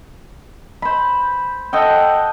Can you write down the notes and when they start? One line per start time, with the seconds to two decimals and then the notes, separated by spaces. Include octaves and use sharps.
0.82 C5 B5
1.73 A4 D#5 F#5 G5